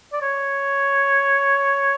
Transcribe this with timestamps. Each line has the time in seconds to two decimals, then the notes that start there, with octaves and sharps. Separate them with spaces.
0.13 D5
0.22 C#5